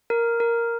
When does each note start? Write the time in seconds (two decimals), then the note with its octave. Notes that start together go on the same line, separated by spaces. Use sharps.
0.10 A#4
0.40 A#4